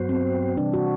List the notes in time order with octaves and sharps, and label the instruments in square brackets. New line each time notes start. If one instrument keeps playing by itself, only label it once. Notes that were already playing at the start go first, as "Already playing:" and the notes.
Already playing: [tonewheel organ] G2 F#3 B3 F#4 C5
[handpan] C4
[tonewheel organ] C3 E3 G3 [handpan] D4
[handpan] F#4